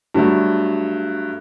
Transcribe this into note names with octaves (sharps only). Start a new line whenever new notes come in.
G2 F#3 A3